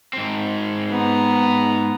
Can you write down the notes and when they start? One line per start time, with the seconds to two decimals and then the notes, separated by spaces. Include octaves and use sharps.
0.13 G#2 C4
0.91 B3 A#5